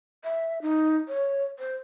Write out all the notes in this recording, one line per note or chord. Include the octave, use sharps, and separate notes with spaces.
E5
D#4
C#5
C5